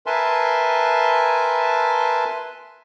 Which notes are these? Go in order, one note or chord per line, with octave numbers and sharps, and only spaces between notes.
A#4 B4 E5 G#5 A5 C6